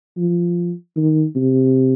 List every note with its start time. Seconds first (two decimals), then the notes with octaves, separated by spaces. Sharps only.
0.18 F3
0.97 D#3
1.36 C3